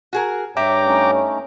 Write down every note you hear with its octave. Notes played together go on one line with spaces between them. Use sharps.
F#4 G#4 A#4
G2 C#5 E5 G5 A#5 D6
A3 C#4 D#4